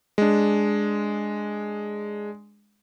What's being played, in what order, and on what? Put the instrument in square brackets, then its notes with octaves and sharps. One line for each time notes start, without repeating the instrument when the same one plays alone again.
[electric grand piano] G#3 D4